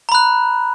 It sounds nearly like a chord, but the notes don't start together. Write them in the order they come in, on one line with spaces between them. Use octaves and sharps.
A#5 B5 F#6